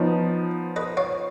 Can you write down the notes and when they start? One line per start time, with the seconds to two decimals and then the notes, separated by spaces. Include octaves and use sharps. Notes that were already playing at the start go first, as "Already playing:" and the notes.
Already playing: F3 B3 D#4 C#5
0.76 B4 D#5
0.97 C#5 F5